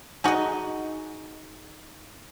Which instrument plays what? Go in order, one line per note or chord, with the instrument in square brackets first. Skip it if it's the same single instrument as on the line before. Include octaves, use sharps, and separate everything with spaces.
[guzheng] D#4 D#5 [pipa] F#4 G#4